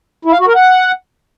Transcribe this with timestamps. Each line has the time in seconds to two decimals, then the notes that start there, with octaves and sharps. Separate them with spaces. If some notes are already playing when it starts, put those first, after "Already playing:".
0.25 E4
0.32 F5
0.40 F#4
0.47 A#4
0.55 F#5